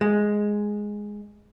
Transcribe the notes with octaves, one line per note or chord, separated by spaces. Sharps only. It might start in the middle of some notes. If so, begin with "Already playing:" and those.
G#3